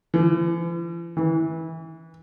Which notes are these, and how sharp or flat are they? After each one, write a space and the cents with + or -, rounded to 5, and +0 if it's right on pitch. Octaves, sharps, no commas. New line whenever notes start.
E3 +45
E3 -20